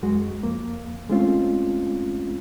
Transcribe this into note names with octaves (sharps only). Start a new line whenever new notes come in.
F#2 G#3 F#4
F2 A#3
G#3 A3 C4 C#4 F4